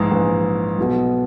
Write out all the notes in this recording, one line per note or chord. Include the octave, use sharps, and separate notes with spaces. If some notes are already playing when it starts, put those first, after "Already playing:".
Already playing: A#1 G#2 E3
A#1 G#2 E3
B1 B2